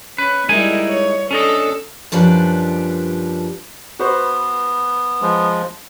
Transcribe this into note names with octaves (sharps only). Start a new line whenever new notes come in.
C#4 B4
G3 G#3 D#4 E4 A#4 G#5
C#5
C#4 D4 A4 D#5
F#2 F3 G3 D4 B4
B3 F#4 B4 C5
F3 G#3